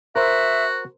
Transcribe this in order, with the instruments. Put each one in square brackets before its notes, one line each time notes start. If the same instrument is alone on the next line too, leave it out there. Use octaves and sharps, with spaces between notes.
[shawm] F#4 [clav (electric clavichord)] A#4 C5 [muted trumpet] E5